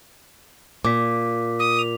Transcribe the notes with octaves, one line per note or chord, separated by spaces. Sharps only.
A#2 D6 B6
D#6
F7